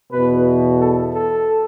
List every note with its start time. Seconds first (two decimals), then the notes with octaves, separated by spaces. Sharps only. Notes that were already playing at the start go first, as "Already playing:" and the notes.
0.11 E2 B2 B4
0.78 A4
1.12 A4